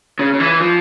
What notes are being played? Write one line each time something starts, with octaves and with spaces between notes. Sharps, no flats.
C#3
C#3
E3
F3